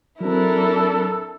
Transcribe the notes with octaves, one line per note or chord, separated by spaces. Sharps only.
F#3 C4 D4 E4 A4 A#4